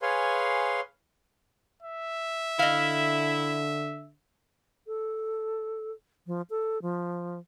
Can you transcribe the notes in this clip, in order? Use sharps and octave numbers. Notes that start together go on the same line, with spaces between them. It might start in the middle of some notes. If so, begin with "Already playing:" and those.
G#4 B4 C#5 F5 G#5 C6
E5
D3 E4 D#5 F5
A4
F3
A4
F3